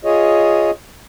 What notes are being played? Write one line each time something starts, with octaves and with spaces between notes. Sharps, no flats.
F4 G#4 C#5 D#5